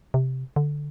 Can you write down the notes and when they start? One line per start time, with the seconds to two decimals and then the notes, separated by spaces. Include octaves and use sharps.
0.14 C3
0.56 D3